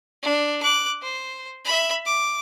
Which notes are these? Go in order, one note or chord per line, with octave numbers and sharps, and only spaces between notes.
D4
D6 F#6
C5
E5 B5
D6